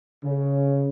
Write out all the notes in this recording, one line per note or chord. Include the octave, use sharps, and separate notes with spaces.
C#3